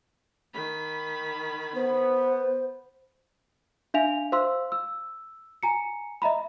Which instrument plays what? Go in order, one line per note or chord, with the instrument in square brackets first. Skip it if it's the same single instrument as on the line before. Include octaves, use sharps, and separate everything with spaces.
[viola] D#3 B5
[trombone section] B3 [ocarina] C5
[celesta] D4 E5 F5 G#5 F7
C5 F5 C6 E6
E6
G#5 A#5 C#7
D#5 E5 A#5 B5